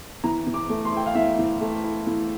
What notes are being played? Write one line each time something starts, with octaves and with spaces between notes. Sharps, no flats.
E3 A#5
E3
D6
A3
C6
E4 G5
F5
E3 E5
E3
A3
E4
E3